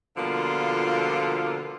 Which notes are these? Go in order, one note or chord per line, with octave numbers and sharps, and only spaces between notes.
B2 D3 F3 G3 A#3 F4